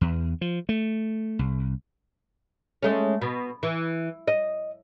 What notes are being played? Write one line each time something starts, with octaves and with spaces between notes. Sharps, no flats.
E2
F3
A3
C2
G#3 A3 C#4
B2
E3
D#5